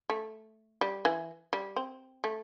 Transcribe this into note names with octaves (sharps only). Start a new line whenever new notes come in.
A3
G3
E3
G3
C4
A3